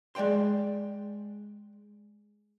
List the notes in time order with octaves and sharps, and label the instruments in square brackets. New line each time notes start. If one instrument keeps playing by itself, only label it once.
[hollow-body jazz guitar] G#3 D5 F5 G5 C6